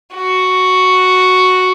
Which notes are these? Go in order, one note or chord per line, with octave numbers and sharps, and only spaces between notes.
F#4